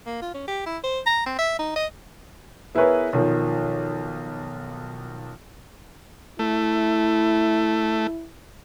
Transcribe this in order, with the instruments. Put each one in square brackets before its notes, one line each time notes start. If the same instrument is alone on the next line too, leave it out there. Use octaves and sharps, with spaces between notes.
[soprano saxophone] A#3
F4
C#4
G4
E4
C5
A#5
C4
E5
D#4
D#5
[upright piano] B3 E4 G#4 A#4 B4 C#5
B1 D#3 F3
[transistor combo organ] A3 [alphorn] E4